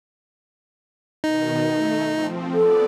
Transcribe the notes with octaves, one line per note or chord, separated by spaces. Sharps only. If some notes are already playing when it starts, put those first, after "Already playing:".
B2 D#3 D#4
A3
F3 C4
B3 A4 D5